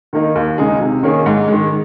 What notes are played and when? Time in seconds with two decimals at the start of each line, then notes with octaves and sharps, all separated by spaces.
0.13 D#3 A#3 D#4
0.35 D#2
0.58 C#3 G#3 D#4 G#4
0.80 C3
1.03 D#3 A#3 C#4 G#4
1.26 G#2
1.48 D#3 G#3